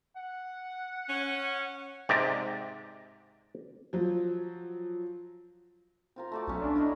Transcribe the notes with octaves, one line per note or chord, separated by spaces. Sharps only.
F#5
C#4
G#2 C3 G4 D5 A#5
F3 F#3
C4 F4 A#4
A3 F#4 D5
B1 C#4 C#5
D4
E4 A#4 D#5